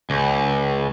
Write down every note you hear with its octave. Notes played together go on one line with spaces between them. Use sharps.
C#2